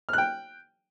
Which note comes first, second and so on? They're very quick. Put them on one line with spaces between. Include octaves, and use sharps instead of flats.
F6 F#6 G5